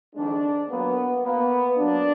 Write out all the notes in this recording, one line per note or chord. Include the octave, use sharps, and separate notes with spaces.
F2 D#3 G#3 D4
A#2 F#3 A#3 B3
B2 A#3 B3
A#2 F#3 A#3 D4